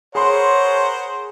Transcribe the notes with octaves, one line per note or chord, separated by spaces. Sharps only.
G#4 A#4 C5 C#5 F#5 B5 C6